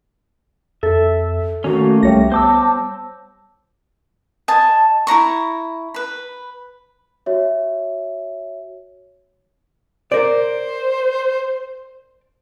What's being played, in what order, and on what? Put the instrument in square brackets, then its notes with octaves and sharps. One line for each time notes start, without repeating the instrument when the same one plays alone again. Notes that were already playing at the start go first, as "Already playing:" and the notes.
[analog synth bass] F2 [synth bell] A4 [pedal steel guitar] E5
[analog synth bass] D#3 [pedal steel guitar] A3 A#3 C#4 [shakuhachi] F#4
[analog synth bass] C2 [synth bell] G3 C#5 A#6 [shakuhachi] E5
[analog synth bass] B3 [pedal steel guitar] C5 D6 E6 [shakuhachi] A5
[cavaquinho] D#5 G#5 A5
E4 C5 A#5 C#6
B4 B5
[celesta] F#4 C#5 E5
[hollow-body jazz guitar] A#4 D5 [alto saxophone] C5